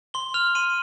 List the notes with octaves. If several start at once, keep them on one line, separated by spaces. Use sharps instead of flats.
C6 G7
F6 F7
C6 D#7